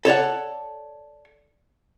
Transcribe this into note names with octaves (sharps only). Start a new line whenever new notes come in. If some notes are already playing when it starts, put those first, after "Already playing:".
A4 C#5 D5 F#5